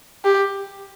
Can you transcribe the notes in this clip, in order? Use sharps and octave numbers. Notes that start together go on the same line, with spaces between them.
G4